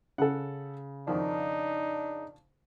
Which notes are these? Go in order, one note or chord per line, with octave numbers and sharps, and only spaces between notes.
C#3 A4 F#5
F2 D#3 F3 D4 D#4